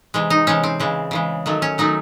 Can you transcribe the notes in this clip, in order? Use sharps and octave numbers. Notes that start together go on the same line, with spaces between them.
C3 E3 G#3
D#4
C3 E3 G#3 C#4
C4
C#3 E3 G#3
C#3 E3 G#3
D#3 F#3 A3
C#4
D#3 F#3 A3 D#4